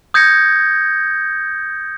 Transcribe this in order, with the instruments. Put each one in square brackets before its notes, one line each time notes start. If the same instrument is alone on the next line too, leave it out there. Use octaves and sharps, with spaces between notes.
[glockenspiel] D#6 G6 G#6 A#6 C#7